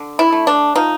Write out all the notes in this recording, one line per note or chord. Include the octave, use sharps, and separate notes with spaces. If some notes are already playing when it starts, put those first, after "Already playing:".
Already playing: D3
E4
A3
D4
F3 D#4